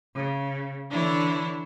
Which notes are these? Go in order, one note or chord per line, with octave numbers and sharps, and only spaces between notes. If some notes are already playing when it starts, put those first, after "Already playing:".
C#3
D3 E3 D4 E4 C#5